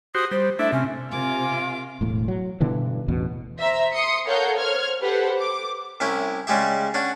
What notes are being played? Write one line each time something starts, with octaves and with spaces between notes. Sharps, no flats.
F#4 G4 C5 D#6
G3 C5
A3 D4 E4 E5
C3 C#4
C3 F4 A#4 G#5 D6
E1 A2
F#3
G2 B2 D3 E3
A1 E2 B2
C5 E5 A#5
C6 D#6 C#7
A4 A#4 C#5 F5 F#5 G6
C5 C#5 F6 G#6
G4 A4 B4 C5 F#5
D6
C2 C#4 E4 G4
C#3 G3 G#3 G4 E5
C#4 D4 F#5